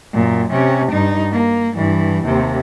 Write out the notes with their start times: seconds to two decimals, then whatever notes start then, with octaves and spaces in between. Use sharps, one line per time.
0.13 F#2 A#2
0.52 C3 C#4
0.91 G2 D#4
1.32 A#3
1.75 G2 E3
2.25 D#2 C3